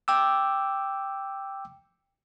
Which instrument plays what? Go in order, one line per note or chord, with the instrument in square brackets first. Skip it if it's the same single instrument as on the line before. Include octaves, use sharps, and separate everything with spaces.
[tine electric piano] G5 D6 E6